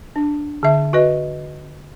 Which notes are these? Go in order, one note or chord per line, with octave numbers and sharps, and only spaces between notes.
D4
D3 E5
F#4 B4 D#5